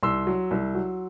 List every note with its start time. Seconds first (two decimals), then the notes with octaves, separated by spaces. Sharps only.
0.03 C2 C6 E6
0.27 F#3
0.51 C2
0.75 F#3